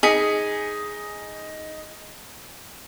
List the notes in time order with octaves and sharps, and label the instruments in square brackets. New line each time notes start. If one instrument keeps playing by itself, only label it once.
[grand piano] D#4 B6 C#7 [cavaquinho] G#4